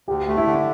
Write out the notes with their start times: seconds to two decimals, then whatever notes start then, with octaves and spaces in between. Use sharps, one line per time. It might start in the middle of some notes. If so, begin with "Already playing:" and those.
0.08 D2 G4
0.28 A3
0.37 E4
0.46 D3